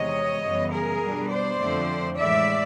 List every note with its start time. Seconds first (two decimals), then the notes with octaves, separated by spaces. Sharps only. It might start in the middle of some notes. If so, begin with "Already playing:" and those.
Already playing: E2 C3 D#3 G#3 C#5 D#5
0.43 F#2 C#3 E3 G3 B3
0.72 G#4 A#4
1.01 B2 G3 B3 D4
1.29 C5 D5
1.58 F2 D3 F3 A3 C4
2.17 A2 E3 G#3 D5 E5